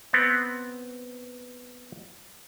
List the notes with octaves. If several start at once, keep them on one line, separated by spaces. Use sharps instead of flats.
B3 C4